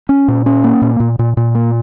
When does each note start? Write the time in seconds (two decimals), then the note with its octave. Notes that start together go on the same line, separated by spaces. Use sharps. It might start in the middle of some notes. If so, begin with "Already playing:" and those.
0.09 C#4
0.28 A#2
0.46 C#4
0.64 A#3
0.82 A#2
1.00 A#2
1.19 A#2
1.37 A#2
1.55 A#3